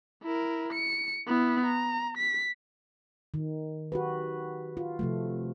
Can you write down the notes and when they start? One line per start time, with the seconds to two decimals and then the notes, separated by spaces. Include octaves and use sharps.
0.23 E4 A#4
0.73 C#7
1.27 B3 E4
1.66 A#5
2.18 B6
3.34 D#3
3.92 F#4 G4 B4
4.77 F4
4.99 C3 F3 A3